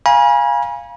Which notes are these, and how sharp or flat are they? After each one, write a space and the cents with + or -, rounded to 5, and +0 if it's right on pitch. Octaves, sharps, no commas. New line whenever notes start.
F5 +0 G#5 -15 B5 -45